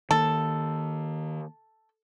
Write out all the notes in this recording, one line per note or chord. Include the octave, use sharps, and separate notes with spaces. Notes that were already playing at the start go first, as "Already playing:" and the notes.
D#3 A#3 A4